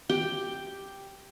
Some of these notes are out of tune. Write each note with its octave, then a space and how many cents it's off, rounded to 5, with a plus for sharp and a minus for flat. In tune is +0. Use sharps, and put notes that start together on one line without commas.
G4 +0 G5 +5